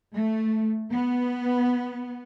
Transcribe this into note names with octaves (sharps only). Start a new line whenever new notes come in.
A3
B3